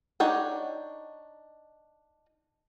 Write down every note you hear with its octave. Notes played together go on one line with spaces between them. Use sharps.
D4 D#4 C#5 F#5 G5